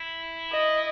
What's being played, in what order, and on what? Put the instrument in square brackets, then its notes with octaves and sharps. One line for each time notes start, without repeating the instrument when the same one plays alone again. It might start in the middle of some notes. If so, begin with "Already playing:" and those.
Already playing: [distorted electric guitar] E4
[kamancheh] D#5